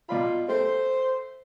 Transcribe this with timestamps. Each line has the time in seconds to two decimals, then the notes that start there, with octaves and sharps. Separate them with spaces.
0.09 B2 F4 D5 B5
0.49 A3 C5